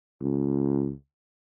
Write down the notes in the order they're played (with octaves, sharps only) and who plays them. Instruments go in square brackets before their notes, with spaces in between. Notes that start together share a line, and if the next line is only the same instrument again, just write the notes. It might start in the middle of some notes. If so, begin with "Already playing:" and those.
[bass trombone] C#2